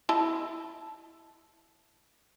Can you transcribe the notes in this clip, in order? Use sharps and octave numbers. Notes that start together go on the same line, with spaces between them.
E4 D#5 A5